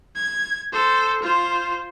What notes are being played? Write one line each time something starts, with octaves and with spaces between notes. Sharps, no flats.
G#6
A4 C5
F4 C5